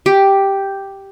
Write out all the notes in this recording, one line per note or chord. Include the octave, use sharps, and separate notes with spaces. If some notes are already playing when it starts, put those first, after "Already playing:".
G4